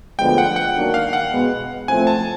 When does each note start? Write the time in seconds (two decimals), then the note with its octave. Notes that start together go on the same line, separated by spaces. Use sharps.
0.18 D2 D3 F3 G#3 B3 G5
0.38 F#5
0.56 F#5
0.75 D#3 F#3 A#3 D4
0.94 F5
1.13 F#5
1.32 B2 G#3 B3
1.88 A2 F3 A3 C4 G#5
2.07 A5